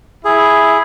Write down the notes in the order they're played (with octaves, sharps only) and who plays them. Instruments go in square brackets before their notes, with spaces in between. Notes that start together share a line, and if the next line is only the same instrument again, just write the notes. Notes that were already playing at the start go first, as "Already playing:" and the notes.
[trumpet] E4 [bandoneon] G#4